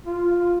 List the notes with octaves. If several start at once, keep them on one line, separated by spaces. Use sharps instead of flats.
F4